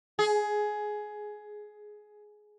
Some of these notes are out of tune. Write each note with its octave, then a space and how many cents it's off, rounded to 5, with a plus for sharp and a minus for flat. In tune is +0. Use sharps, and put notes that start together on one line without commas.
G#4 +15